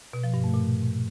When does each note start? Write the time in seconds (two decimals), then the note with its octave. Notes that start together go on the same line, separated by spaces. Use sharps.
0.13 B2
0.24 F3
0.34 G2
0.44 A3
0.54 A#2